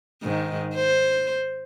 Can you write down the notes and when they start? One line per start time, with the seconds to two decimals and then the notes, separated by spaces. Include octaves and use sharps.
0.23 G#2 D#3
0.75 C5